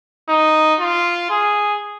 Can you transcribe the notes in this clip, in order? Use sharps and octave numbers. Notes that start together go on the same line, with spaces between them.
D#4
F4
G#4